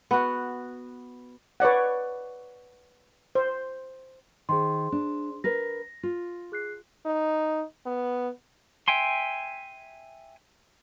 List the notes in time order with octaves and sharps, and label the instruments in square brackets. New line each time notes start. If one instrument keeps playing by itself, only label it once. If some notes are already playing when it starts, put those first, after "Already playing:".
[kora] B3 F#4
[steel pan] B4 C#5 D5 F#5
C5
[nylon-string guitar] D#3 [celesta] G#4 C5 C6
[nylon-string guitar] D4
[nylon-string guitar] A#4 B4 [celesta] A#6
[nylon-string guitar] F4
[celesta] G#4 F#6 C7
[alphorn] D#4
B3
[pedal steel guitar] E5 G5 G#5 C6